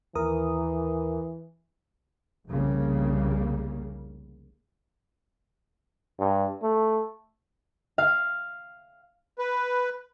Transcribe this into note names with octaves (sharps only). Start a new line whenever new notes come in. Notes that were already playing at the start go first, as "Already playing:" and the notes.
D#2 E3 A#4 D#6
F1 C2 C#3 G3 A#3
G2
A3
F5
B4